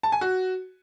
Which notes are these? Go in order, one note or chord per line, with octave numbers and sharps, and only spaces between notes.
A5
G#5
F#4